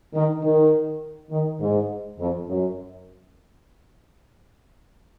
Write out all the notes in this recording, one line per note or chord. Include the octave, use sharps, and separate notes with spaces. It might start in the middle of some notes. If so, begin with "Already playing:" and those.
D#3
D#3
D#3
G#2
F2
F#2